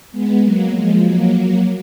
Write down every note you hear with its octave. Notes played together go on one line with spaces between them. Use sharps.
G#3 B3
F#3 A#3
F3 G#3
F#3 A#3